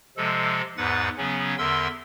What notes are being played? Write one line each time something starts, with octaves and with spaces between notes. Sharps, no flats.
C3 F3 G#3 A4
E2 G#2 B4 F#5 A6
C#3 F#3 B3 C#4
E2 D3 A#4 E5 C6 E6